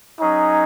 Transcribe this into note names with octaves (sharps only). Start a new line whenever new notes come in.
F#3 C#4 D#4 G#4